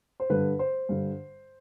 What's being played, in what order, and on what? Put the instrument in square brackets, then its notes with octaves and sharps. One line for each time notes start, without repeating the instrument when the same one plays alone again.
[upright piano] C5
G2 D3 B4
C5
G2 D3